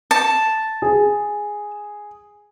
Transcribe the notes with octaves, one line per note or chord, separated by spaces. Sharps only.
A5
G#4